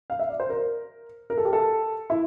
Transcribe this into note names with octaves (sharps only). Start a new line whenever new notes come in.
F5
E5
D5
C5
A#4
A#4
A4
G4
A4
E4